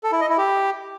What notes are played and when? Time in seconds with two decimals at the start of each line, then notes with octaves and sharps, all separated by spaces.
0.04 A4
0.12 E4
0.21 D#5
0.29 E4
0.38 G4